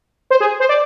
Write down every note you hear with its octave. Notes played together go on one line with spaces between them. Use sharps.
C5
G#4
C5
D5